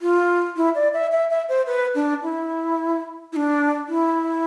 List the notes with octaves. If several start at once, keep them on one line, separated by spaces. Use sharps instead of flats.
F4
E4
D5
E5
E5
E5
C5
B4
D4
E4
E4
D4
E4